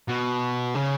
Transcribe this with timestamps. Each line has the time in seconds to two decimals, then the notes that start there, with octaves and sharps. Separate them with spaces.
0.08 B2
0.75 C#3